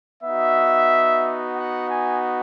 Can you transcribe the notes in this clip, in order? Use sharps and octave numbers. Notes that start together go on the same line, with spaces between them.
B3 D#4 F#4 E5
F#5
G#5